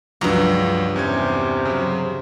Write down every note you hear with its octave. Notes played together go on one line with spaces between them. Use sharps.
C#2 G2 F3 F#3 A#5
E2 C3 C#4 G#6
C#3 F#3